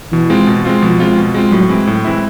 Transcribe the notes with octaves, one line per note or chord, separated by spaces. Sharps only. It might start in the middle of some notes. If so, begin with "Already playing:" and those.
B2 E3
G#3 C4 F4
B2
G#3 C4 F4
B2 F3
G#3 C4 F4
B2
G#3 C4 F4
A2 F#3
E3 G#3 C4 E4
A2
E3 G#3 C4 E4